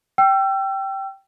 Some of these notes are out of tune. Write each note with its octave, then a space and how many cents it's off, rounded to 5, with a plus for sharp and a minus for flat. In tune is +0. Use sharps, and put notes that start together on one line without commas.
G5 -10 E6 +35